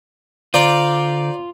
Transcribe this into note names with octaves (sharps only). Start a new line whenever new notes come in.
D3 F4 C5 D5 A#5 D6